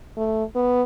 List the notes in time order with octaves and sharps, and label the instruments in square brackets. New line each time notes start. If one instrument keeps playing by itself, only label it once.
[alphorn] A3
B3